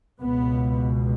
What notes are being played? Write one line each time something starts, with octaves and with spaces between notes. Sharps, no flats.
C#2 B2 B3